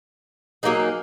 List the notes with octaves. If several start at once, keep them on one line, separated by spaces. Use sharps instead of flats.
F#3 A#3 D#4 G#4